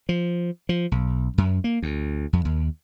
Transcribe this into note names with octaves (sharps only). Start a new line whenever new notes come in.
F3
F3
B1
F#2
A#3
D2
F2
D#2